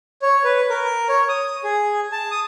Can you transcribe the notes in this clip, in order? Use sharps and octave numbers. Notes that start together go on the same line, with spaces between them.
C#5
B4
A#4
C#5
D#6
G#4
A5
D#6